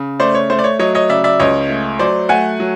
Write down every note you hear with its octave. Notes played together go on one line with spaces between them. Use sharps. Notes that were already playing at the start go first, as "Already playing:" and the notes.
Already playing: C#3
A3 C5 D5
C#5
A3 C5
D5
C#5
F#3 C#5 D#5
C#5 D#5
C#3 D5 E5
D5 E5
C#2 C#5 D#5
A3
F#3 C5 D5
A3 F#5 G#5
F#3